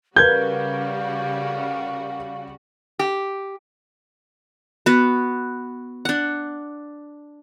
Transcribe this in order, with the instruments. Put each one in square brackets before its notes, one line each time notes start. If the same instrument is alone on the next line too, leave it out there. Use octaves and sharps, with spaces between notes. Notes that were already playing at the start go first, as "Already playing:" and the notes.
[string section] C#3 G3 F#4 [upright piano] A#4 B4 [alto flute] F5 [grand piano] G6 G#6
[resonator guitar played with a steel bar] G4
[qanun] B3 F#4
D4 F#5